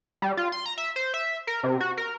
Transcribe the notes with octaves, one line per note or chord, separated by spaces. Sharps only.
G3
F4
C6
A#5
E5
C5
E5
A#4
C3
F#4
A#4